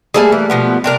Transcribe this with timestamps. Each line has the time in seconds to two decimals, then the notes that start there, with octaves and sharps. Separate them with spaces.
0.14 G3 A3 A#3 G#4 A4 G#5
0.32 E3
0.50 B2 F3 B3
0.84 C3 D4 A#4